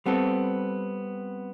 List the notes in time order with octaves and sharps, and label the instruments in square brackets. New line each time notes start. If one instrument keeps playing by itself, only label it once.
[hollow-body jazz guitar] G3 B3 C4 A4